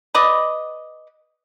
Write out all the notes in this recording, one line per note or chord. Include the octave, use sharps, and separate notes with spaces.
B4 D5 D#5